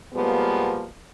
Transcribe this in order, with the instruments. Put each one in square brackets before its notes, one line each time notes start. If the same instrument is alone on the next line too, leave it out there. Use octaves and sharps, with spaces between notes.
[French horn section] B2 F3 G3 G#3 A#3 B3